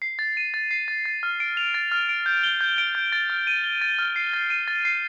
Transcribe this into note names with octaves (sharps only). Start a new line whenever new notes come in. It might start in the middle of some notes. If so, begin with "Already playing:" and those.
C7
A6
D#7
A6
C7
A6
A6
F6
D7
F7
A6
F6
D7
G6
G7
G6
D7
G6
A6
F6
D#7
G7
A6
F6
C7
A6
D#7
A6
C7